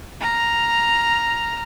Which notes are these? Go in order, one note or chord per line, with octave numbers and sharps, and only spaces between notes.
A#5 F6